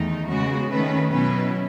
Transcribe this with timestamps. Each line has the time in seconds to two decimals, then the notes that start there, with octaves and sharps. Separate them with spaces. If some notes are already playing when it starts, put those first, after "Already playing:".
Already playing: E2 D#3 A3 D#4
0.28 C#3 G#3 B3 F#4
0.70 D#3 A3 C#4 B4
1.11 B2 F#3 C#4 E4 B4